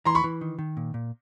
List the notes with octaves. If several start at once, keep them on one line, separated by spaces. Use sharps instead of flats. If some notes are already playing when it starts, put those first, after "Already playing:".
E3 A#5 C6
B5 C#6
E3
D#3
D#3
A#2
A#2